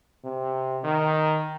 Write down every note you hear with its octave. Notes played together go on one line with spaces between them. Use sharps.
C3
D#3